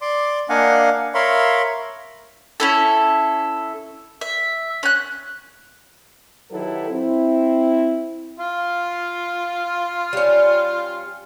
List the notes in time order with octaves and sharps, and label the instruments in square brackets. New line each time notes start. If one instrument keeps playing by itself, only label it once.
[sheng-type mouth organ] D5 C6 D6
A#3 D4 D#5 F5 F#5 G#5
A#4 C#5 E5 F5 B5 C6
[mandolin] C#4 E4 A4
E5
C#4 F#6
[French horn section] D#3 F#3 E4 G4 A4 B4
C4 E4
[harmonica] F4 F5
[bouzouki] G3 C#4